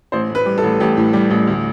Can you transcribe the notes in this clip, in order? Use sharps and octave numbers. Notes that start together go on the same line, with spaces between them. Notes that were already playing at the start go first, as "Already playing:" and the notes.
A1 C5
A2
B4
G3
A4
A1
A1 G4
A2
G3
A1
D2